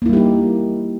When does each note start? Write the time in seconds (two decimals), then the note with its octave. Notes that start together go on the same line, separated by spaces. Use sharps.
0.02 A#3
0.06 E4
0.09 G3
0.13 G4
0.17 D#4